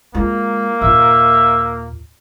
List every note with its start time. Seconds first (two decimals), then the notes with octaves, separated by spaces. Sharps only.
0.15 G#3 A#3 F4
0.81 D#2 A#2 E5